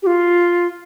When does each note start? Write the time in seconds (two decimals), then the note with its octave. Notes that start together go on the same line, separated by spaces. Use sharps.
0.03 G4
0.07 F4